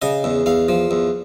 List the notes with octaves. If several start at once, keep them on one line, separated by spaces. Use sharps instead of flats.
C#3 D#5
E2
E2 F5
F3
E2